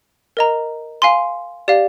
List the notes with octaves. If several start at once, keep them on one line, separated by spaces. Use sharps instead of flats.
A#4 D#5 A#5
F5 G#5 C6
G4 D5 F5